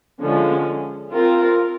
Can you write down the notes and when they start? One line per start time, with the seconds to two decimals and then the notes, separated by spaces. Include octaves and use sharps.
0.19 D3 F3 G#3 C#4
1.12 C4 F4 A#4